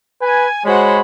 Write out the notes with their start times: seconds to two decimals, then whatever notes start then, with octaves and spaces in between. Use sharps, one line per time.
0.22 B4 G#5
0.65 G#3 F#4 C5 C#5 F#5 B5